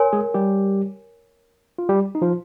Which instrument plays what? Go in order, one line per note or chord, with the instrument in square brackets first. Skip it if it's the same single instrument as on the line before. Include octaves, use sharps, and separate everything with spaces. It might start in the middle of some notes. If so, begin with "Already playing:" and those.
Already playing: [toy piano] A#4 C#5 G#5 C6
[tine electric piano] G#3 G#4
G3 G4
F4
G3 G4
D#4
F3 F4